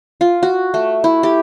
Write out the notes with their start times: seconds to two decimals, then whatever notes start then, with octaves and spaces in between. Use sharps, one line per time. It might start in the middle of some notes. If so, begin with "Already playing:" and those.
0.21 F4
0.43 F#4
0.74 A3
1.04 E4
1.23 G4